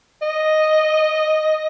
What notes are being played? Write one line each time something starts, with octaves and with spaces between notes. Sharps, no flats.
D#5